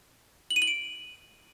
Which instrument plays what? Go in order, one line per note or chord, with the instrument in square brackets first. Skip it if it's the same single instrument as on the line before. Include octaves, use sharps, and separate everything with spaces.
[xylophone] F#7
D#7
F#7
D7